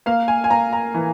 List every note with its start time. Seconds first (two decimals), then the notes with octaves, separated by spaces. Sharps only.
0.06 A#3 F5
0.28 G#5
0.44 G#5
0.50 A#3 A#5
0.73 A#5
0.94 E3